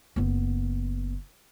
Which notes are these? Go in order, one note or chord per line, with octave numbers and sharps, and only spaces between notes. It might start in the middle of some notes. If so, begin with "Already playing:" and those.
F#1 B3